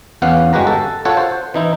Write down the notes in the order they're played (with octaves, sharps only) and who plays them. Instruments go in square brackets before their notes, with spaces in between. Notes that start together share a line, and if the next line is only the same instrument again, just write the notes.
[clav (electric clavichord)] E2 B3 C#4 F5 F#5
G1 G#3 F#4 G4 B4 A#5
A4
F4 A4 C#5 F#5
C5
E3 D#4 E4